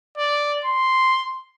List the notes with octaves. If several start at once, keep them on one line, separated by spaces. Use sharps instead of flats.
D5
C6